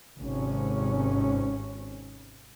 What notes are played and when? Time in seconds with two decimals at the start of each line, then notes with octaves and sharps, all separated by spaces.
0.21 G#1 C3 C#4